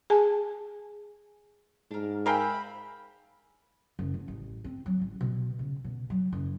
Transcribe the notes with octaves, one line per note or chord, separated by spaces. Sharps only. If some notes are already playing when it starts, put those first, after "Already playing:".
G#4 G#5 A5
G#2 D4 A#4
A#4 E5 F5 G5 G#5 A#5 B5
F#1
E2
A1
C4
F#3
A1
B2
C#3
B2
F#3
F#1